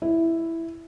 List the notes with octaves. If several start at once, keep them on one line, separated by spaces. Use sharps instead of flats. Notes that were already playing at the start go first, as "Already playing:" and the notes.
E4